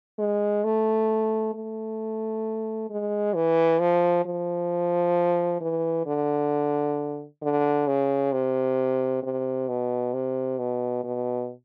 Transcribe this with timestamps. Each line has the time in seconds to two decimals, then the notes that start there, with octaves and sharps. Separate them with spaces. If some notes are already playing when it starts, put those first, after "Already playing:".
0.19 G#3
0.64 A3
1.54 A3
2.90 G#3
3.35 E3
3.81 F3
4.25 F3
5.61 E3
6.06 D3
7.42 D3
7.87 C#3
8.33 C3
9.23 C3
9.69 B2
10.14 C3
10.59 B2
11.04 B2